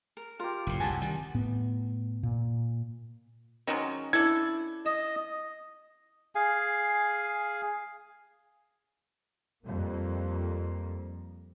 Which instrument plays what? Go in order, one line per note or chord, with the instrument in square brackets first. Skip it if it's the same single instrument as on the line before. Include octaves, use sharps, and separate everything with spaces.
[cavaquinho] A#4
[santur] F4 G4 [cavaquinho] A#4
[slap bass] F#1 A2
[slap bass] C2 F#2 [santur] F#5 D#6 [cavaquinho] G#5 A5
[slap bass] D#3 G3
[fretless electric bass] A2 B3
A#2
[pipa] D#3 F#3 G#3 [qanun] C#4
[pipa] D4 A4 [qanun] E4 [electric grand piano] G#6
[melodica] D#5 [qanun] A5
[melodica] G#4 F5 G#5
[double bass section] F2 G3 A#3